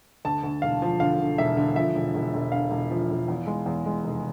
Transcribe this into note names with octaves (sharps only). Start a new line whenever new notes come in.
D2 A5
D2
E1 F5
F3
D3 F5
D3
E1 E5
D3
F3 E5
E1
E1
E1
D3 F5
E1
F3
E1
E2
G#3
E2
G#3
F1